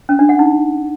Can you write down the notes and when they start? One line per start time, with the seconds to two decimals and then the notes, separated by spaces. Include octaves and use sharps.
0.09 C#4
0.19 D4
0.29 F#5
0.39 D#4